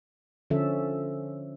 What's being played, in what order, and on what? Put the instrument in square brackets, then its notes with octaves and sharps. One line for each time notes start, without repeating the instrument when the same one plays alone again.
[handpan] D3 F3 C#4 A4 E5